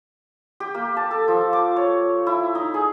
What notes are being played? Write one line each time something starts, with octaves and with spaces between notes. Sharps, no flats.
G4
A#3
A5
A4
F3
D6
C#5
E4
D#4
G#4